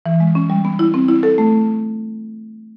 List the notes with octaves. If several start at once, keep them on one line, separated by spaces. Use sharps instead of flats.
E3
G#3
C#4
G3
B3
E4
C4
E4
A4
A3